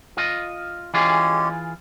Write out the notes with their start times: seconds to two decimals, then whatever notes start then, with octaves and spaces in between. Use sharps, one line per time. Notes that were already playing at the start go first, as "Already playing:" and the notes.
0.17 F4 D#5
0.94 E3 G#3 C#4 F4 G4 G#4